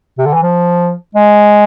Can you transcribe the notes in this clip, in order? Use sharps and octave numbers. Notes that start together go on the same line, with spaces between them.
C3
D3
E3
F3
G#3